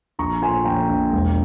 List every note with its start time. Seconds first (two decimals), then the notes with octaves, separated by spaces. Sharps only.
0.19 A#1 A#5 C#6
0.42 A#2 G#5 C6
0.65 A#1 G5 A#5
0.89 A#1
1.13 E1